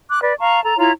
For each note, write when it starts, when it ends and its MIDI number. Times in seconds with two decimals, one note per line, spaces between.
0.09 0.19 86
0.09 0.19 90
0.23 0.34 71
0.23 0.34 74
0.39 0.60 77
0.39 0.60 81
0.39 0.60 82
0.39 0.60 85
0.63 0.76 69
0.63 0.76 82
0.78 0.91 64
0.78 0.91 65
0.78 0.91 73
0.78 0.91 82